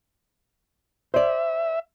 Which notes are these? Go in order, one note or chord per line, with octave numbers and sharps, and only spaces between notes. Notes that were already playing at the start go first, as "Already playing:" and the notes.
C5 D5 E5